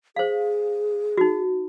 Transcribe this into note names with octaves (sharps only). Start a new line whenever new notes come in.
G#4 C5 F5
D#4 F#4